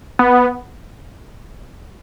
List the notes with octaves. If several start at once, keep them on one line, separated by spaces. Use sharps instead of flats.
B3